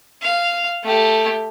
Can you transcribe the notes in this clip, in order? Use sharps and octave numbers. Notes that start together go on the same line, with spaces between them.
F5
A3 G4